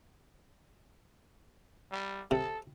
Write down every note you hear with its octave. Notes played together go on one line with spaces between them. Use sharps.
G3
C3 A4